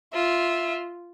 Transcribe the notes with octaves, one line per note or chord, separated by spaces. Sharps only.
F4 E5